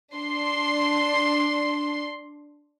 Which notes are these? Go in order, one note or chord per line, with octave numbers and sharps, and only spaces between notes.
D4 C6